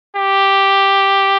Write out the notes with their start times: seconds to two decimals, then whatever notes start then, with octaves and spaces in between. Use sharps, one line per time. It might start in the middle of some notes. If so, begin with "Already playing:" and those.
0.16 G4